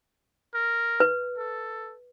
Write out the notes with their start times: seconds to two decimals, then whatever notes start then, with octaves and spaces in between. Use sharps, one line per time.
0.55 A#4
1.00 B4
1.37 A4